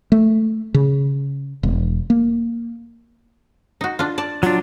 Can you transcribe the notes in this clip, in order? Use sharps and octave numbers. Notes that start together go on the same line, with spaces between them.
A3
C#3
E1
A#3
D#4 F#4
D4 F4
D5 A5
F#3 D4 F4